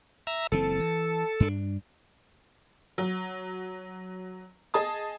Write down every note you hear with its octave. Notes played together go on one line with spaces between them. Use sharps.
E5 A#5
F#1 E3 C4 A4
E3
G2 D4
F#3
G#4 D#5 A5 D#6